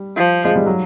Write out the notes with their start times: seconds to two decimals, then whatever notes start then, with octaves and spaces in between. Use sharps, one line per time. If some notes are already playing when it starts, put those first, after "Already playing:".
Already playing: G3
0.17 F3
0.45 G#3
0.56 G3
0.66 F#3